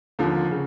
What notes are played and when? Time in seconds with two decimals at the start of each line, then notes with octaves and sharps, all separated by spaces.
0.19 D#2 D3 F3 A#3
0.51 C#3